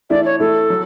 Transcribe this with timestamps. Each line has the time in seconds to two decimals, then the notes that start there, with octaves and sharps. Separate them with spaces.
0.10 E3 A3 E4 D5
0.25 C#5
0.39 E3 A3 E4 A4
0.70 F#3